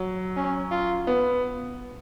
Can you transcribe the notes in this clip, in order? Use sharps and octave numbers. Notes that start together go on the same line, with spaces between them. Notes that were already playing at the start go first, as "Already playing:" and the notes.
Already playing: F#3
C#4
F4
B3